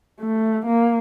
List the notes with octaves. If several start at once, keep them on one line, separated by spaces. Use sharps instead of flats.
A3
A#3